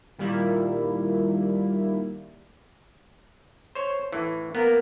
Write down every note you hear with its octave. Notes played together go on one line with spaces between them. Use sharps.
A#2 D#3 G3 A#3 E4
C5 C#5
A2 E3
A#3 B3 A#4